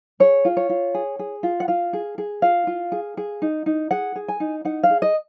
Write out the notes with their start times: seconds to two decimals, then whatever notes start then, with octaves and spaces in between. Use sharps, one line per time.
0.20 G#4 C#5
0.45 F4
0.57 C#5
0.69 F4
0.94 G#4
1.19 G#4
1.43 F4
1.60 F#5
1.68 F4 F5
1.93 G#4
2.18 G#4
2.42 F4 F5
2.67 F4
2.92 G#4
3.17 G#4
3.42 D#4
3.66 D#4
3.91 G#4 F#5
4.16 G#4
4.28 G#5
4.40 D#4
4.65 D#4 F#5
4.83 F5
4.90 G#4
5.02 D#5